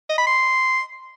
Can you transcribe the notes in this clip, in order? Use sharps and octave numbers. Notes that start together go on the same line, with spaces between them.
D#5
B5
C6